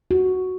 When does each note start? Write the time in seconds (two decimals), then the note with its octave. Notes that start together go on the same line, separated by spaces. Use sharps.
0.11 F#4